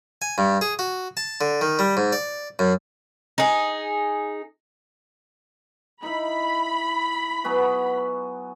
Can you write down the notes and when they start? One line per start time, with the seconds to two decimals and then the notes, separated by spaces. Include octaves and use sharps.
0.22 G#5
0.38 G2
0.61 G#4
0.79 F#4
1.17 A5
1.41 D3
1.61 D#3
1.79 G3
1.97 G#2
2.12 D5
2.59 F#2
3.38 D#4 G#4
6.03 D#4 E4 B5
7.44 F#3 B3 G#4